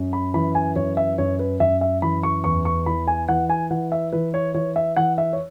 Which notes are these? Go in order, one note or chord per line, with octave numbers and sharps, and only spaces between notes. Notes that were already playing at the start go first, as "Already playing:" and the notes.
Already playing: F#2
B5
E3 B5
G#5
F#2 C#5
E5
F#2 C#5
B4
F#2 E5
E5
E3 B5
C#6
E2 C#6
C#6
E3 B5
G#5
E3 F#5
G#5
E3 F#5
E5
E3 B4
C#5
E3 C#5
E5
E3 F#5
E5
C#5